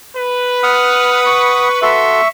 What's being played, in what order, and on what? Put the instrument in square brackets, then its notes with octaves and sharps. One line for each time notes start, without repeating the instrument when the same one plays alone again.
[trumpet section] B4
[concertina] F#5 D#6 [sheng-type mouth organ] F6
[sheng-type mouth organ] C#6
[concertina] F#4 A4 C6 [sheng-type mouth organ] E5 C#6